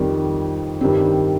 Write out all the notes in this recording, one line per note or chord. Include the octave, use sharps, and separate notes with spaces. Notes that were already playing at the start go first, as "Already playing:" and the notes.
Already playing: F2 D#3 G3
G2 D#3 G3 C4